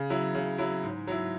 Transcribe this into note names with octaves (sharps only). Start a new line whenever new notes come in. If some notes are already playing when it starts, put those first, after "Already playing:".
Already playing: C#3
F#3 E4
C#3
F#3 E4
G#2
F#3 E4